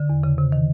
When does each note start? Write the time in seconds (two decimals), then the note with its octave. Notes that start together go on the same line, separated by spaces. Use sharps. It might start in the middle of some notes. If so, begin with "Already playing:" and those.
Already playing: D3
0.10 E2
0.24 C#3
0.38 C3
0.52 D#3